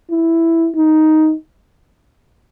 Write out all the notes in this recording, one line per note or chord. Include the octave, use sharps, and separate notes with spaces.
E4
D#4